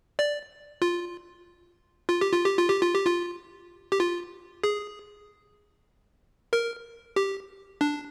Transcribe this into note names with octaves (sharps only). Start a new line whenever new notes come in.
D5
F4
F4
G4
F4
G4
F4
G4
F4
G4
F4
G4
F4
G#4
A#4
G4
D4